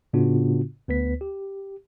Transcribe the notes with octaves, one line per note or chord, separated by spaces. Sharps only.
A2 C#3 B3 D4 F4 F#4
D2 B3 B4 B6
G4